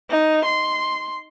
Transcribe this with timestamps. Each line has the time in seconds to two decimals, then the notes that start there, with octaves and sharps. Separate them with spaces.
0.11 D#4
0.45 C6